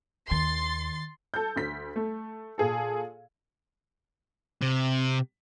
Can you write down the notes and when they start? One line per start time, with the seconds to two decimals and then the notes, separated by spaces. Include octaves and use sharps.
0.31 D#2 D#3 C6 A6 C7
1.34 A4 G6
1.56 D2 B6
1.96 A3
2.58 A#2 G#4 A4
4.62 C3